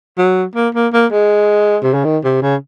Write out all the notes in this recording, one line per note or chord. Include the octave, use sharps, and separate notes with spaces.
F#3
A#3
A#3
A#3
G#3
C3
C#3
D#3
C3
C#3